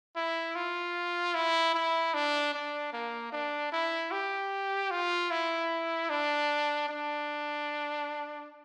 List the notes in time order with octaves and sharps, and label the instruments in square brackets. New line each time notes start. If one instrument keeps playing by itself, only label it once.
[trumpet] E4
F4
E4
E4
D4
D4
A#3
D4
E4
G4
F4
E4
D4
D4